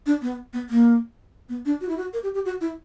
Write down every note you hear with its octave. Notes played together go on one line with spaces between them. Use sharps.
D4
B3
B3
A#3
B3
D4
F#4
E4
F#4
A#4
G4
G4
F#4
E4